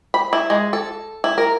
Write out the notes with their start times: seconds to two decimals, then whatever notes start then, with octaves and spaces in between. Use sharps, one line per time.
0.14 B5
0.33 E4
0.50 G#3
0.73 A4
1.24 E4
1.38 A#4